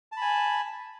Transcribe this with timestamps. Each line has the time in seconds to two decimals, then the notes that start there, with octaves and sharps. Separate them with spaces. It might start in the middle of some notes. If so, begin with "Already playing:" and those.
0.12 A5
0.17 B5
0.21 G#5